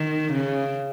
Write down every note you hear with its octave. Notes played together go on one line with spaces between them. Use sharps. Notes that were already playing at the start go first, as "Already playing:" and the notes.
Already playing: D#3
C#3